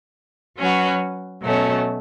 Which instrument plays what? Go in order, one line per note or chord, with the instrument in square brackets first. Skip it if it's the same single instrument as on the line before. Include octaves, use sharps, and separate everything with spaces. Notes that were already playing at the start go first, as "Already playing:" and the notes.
[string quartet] F#3 C#4 F#4 B4
B2 F#3 A3 C#4